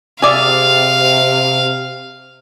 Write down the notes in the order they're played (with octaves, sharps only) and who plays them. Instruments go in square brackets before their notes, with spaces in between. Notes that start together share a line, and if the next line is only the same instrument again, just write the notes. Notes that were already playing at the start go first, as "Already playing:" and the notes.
[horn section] C3 [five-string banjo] G#4 D5 E5 [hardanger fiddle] F5